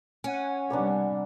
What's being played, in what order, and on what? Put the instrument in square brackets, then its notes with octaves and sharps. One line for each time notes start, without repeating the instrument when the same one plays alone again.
[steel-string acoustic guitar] C#4 [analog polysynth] F#5 G#5
[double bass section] C3 G3 [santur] A#3 B3 D4